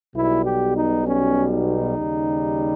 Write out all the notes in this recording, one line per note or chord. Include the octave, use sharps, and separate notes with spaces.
B1 B2 G3 E4
G4
D#4
C#4
D#4
D#2 C#3 G3